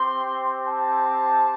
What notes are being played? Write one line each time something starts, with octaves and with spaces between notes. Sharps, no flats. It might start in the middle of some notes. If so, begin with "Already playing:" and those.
Already playing: C4 G4 C6
A5